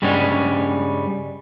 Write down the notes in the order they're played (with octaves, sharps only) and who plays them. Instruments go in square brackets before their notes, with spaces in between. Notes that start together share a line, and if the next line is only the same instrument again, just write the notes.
[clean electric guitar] G2 C#3 G3 G#3 C#4